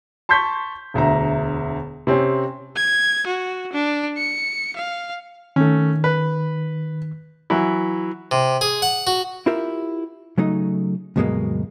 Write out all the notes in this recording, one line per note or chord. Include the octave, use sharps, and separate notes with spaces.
A5 C6 C#6 G6 B6
E1 D2 E5 A#5
C3 C4 C#4
G#6
F#4
D4
C#7
F5
D#3 A3 C#4
B4
E3 F#3 E4
C3
G#4
F#5
F#4
E4 F4 G4 A#4 E5
C#3 F#3 A3 D#4
D2 G2 B2 F#3 G#3 A#3